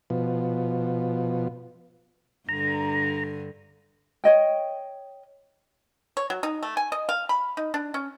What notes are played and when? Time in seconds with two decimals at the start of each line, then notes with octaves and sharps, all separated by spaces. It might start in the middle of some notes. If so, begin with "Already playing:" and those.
0.10 B2 F3
2.49 G2 D3 A#5
4.24 C#5 D#5 G5
6.17 C#5
6.30 F#3
6.43 D#4
6.63 A3
6.77 G#5
6.92 D#5
7.09 F5
7.29 B5
7.57 D#4
7.74 D4
7.94 C#4